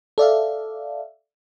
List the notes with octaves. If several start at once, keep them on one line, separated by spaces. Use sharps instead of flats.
A4 D5 E5 F5